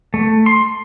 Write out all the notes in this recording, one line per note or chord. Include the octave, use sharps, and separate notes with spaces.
A3
C6